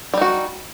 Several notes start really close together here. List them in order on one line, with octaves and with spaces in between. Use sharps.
G3 D#4 F#4